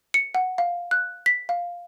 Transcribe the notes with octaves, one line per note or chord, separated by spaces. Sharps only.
C#7
F#5
F5
F#6
B6
F5